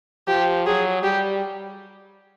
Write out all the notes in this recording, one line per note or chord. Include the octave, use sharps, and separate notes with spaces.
F3 G4
F#3 G#4
G3 G4